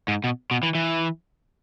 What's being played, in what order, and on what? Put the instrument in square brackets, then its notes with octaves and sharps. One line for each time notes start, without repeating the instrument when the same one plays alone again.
[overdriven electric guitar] G#2
B2
B2
E3
E3